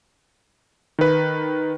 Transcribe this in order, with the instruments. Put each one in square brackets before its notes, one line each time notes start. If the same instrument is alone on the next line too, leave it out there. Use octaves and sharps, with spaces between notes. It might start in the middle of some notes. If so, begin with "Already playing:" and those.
[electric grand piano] D#3 B4